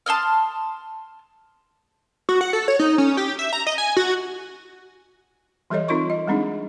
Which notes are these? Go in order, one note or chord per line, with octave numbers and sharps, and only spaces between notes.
A5 C6 D#6 F6
F#4
F#5
A4
C#5
D#4
C#4
G4
E5
A#5
D#5
G#5
F#4
E3 G3 G4 A4 C#5 D#5
C4 D#4 F4 A#4 C6 C#6
D#5
G3 G#3 C4 D4 D#4 G#4